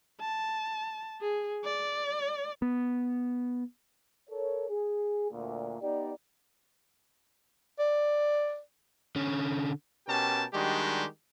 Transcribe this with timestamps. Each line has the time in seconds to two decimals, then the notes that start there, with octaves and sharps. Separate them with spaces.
0.21 A5
1.21 G#4
1.65 D5
2.62 B3
4.30 A4 A#4 C#5
4.69 G#4
5.31 D2 A#2
5.81 B3 D#4 G4 D5
7.79 D5
9.16 D3 C#4
10.07 B2 C#4 G4 A#4 G5 A5
10.53 D#3 G3 G#3 D4 F#4 G4